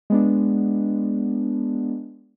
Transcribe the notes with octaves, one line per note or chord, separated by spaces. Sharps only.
G#3 B3 D4